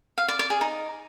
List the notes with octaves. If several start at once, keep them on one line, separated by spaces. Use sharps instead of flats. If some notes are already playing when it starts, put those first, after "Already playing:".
F5
D5
D5
G#4
D#4